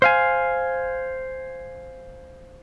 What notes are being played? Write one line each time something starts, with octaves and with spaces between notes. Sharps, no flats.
C5 F5 G#5